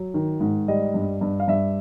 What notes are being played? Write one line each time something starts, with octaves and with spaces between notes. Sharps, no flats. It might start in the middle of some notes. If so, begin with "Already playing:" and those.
Already playing: F#3
D#3
G#2
G3 D#5
G2
G2
F5
G2 E5